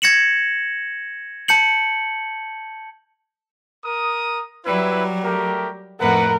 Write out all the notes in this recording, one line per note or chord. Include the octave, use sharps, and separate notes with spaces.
G#6 A#6 C#7 E7 F#7
A5 G6 C#7 F#7
A#4 D#6
F#3 G3 E4 B4
A3 G4 A#4
F2 A2 A#4 B4 F#5